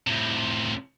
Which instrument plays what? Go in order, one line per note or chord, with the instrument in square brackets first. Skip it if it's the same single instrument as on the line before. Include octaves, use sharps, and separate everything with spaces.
[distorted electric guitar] A2 C3